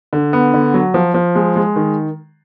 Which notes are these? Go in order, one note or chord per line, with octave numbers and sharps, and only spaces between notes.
D3
B3
D3
F#3
F3
F3
G#3
G#3
D#3